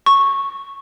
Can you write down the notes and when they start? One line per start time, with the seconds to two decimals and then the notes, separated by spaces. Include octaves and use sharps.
0.06 C#6